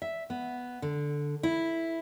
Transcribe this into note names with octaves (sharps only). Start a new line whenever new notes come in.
E5
B3
D3
E4